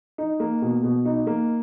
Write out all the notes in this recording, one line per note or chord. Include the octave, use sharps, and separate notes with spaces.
D#4
A#3
B2
B2
D#4
A#3